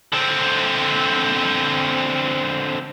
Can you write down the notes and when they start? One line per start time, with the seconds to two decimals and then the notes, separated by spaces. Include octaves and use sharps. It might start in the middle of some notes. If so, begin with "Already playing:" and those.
0.13 D3 C4